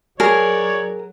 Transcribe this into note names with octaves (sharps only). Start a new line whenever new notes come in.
F#3 G#4 A#4 C#5 D5